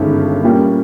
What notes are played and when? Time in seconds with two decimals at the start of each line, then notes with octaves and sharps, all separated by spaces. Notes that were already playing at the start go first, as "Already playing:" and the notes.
Already playing: G1 G2 D#3 G#3 C#4
0.43 A#2 G3 A#3 C#4